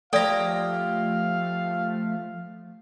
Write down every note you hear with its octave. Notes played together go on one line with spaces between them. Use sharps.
F3 A3 G4 A4 D5 F5 A#5